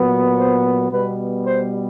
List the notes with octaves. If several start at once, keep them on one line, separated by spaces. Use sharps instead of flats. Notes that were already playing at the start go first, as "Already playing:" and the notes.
Already playing: A#2 F#3 B3
C5
B2 G3 B3 B4
C5